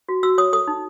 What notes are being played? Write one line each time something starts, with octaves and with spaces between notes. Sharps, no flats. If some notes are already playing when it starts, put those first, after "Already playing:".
F#4
F#4 E6
C#5 D#6
A4 D#6
D#4